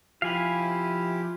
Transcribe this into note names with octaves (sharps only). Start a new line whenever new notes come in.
C3 F3 E4 F4 G4 F5 G#5 B5